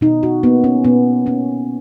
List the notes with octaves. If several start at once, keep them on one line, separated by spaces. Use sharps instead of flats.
B2 D#4
F#4
A#3 B3
C#4
B2 B3
A#3 C#4